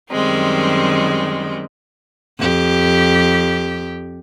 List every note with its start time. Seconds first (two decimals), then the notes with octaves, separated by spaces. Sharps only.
0.10 F#2 D#3 G3 G#3 C4
2.39 F2 G4